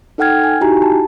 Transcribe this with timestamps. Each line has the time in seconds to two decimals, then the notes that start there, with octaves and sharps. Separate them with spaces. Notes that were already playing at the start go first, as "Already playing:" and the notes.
0.18 D#4 A4 F#5 G5 F6 G#6
0.44 G#5
0.61 D#4 E4 F#4 G4 G#5 A#5
0.82 A5